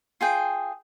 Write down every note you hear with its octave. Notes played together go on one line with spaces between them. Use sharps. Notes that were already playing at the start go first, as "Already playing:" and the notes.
F4 G#4 G5